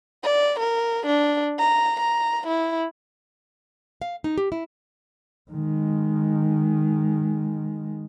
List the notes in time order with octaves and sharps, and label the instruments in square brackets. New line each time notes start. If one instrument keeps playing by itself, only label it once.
[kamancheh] D5
A#4
D4
A#5
A#5
E4
[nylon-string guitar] F5
D#4
G4
E4
[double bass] D#3 G#3